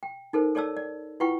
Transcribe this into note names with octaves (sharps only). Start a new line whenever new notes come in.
G5
D#4 A4 A#4 C5
A4 C#5 D5 A5 E6
D5
E4 F4 B4 F#5 G5 C#6